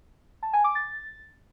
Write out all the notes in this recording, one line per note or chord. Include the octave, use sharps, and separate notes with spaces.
A5
G#5
D6
A6